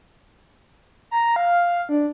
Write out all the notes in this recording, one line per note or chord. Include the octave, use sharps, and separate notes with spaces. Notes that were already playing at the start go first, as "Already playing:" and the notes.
A#5
F5
D4